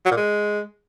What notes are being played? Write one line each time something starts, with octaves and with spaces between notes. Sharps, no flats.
F#3
A#2
G#3